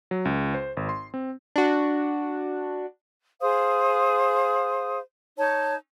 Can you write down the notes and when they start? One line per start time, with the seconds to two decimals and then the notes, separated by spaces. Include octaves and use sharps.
0.11 F#3
0.25 C#2
0.54 C5
0.77 G#1
0.89 C6
1.14 C4
1.56 D4 F#4
3.42 G#4 C5 F5 D#6
5.37 D#4 C#5 A5